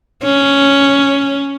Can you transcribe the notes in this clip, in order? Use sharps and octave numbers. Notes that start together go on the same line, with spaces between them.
C#4